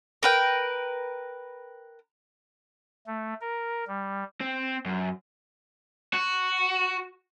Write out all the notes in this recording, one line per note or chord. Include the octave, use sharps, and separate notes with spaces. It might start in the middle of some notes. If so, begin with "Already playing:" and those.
A#4 B4 G5
A3
A#4
G3
C4
F#2
F#4